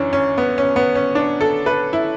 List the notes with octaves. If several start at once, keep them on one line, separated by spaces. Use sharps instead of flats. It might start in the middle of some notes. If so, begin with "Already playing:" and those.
Already playing: F#2 E3 C#4 D4
C#4
B3
C#4
B3
C#4
D4
A4
B4
E4